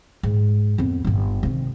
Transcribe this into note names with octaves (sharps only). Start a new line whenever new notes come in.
G#2
F2 B3
G1 G2
C3 D#3